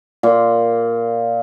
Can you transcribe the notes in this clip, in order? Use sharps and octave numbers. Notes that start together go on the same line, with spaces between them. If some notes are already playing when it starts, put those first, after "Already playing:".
A#2